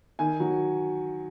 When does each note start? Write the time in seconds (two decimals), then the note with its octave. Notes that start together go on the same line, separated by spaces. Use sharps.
0.19 D#3 G#5
0.40 F#3